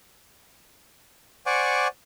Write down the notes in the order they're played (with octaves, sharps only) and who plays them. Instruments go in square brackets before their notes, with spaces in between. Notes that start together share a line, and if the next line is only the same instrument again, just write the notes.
[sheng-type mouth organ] C5 D5 F#5 G#5 C#6 D6